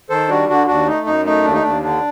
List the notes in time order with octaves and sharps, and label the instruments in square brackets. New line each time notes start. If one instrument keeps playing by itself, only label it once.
[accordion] D#3 A4 C5
G3 D4 F#4
D3 D4 F#4
D#2 D4 F#4
A3 D#4
F#2 D#4
A3 D#4
D#2 D4
D#4
D#2 D4
D3 D4